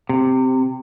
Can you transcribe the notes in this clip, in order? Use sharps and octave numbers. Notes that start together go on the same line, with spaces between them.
C3